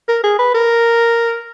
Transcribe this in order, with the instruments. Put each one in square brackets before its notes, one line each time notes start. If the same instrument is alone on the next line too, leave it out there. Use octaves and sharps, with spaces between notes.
[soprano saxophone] A#4
G#4
B4
A#4